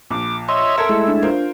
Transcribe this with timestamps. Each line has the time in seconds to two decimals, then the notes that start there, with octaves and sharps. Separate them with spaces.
0.11 A#1 D6
0.49 C#5 D#5 E5 C6 E6
0.78 A4 A#4 E5 A#5 G#6
0.89 G#3 A3 E4
1.08 D4
1.22 F4 A#4 C5